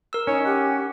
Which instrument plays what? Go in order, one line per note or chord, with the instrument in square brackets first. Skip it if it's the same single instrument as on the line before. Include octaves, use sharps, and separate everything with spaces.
[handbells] A#4 E6
[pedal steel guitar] C#4 [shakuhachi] D#4 [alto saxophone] C#5
[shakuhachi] G4 [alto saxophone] F#5